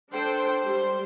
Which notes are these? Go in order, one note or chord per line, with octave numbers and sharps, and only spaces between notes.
D4 A4 C5 G5
G3 C5